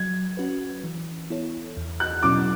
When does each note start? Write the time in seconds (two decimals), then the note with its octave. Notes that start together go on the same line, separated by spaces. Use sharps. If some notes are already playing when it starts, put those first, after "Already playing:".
Already playing: F#3 G#6
0.37 C#4 F#4 B4
0.84 E3
1.30 B3 E4 A4 C#5
1.77 E2
2.00 F#6
2.23 B2 F#3 C#4 E4 D6